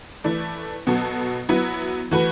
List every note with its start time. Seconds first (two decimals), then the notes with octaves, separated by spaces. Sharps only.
0.24 E3 A3 E4 D5
0.87 B2 F#3 B3 F#4 A4
1.49 F#3 B3 E4 B4
2.11 E3 A3 F#4 B4